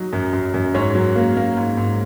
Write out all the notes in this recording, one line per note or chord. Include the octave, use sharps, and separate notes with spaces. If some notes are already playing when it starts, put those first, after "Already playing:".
Already playing: F#3 D#4
F#2
F#2
F#2
G#2 C#4 C#5
F#3
A#3
A#3
G#2
G#2